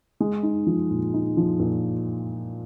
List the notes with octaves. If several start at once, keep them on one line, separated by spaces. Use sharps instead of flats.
G#3
D#4
F3
A#2
D#4
F3
A#2